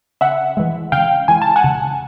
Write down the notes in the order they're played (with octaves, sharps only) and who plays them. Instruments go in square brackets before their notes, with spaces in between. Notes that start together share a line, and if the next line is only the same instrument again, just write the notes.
[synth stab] C#3 E5 F#5
E3 G#3
C#3 F5 G5
E3 G#3 G#5
A5
F#5 G#5
C#3